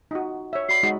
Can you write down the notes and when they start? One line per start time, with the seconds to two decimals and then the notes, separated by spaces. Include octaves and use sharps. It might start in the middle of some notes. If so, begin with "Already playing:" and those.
0.11 D#4 F4 F#4
0.53 C#5 E5
0.69 F#4 D5 B5 C7
0.83 G#3 D#4 F#4